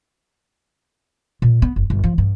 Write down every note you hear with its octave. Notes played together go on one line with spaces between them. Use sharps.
A#2
B3
F#1
G1
F3
G2